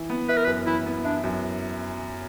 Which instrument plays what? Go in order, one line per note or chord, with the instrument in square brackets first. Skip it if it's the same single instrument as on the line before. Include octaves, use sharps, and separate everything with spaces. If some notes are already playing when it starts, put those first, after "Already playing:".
Already playing: [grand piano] E3
B3
[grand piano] E4 [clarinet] B4
[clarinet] A#4
[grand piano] F#2 [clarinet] B4
[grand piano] E3 [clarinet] E4
[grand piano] B3
[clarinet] D4 [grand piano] E4
[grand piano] F#2